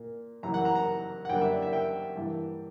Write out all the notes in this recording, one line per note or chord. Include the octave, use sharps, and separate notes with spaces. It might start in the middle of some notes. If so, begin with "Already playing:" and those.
Already playing: A#2 A#3
F#2 E3 G3 A#3 A#5
F#5
A#5
A#5
F#5
F#2 D3 G3 A#3 G5
E5
D5
E5
G5
G2 E3 A#3